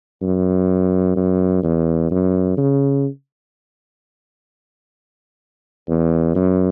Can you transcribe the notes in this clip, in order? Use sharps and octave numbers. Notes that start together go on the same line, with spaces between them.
F#2
F#2
E2
F#2
C#3
E2
F#2